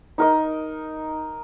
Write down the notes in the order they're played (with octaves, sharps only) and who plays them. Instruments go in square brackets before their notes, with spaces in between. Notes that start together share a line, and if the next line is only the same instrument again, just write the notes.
[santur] D#4 A#4 D#5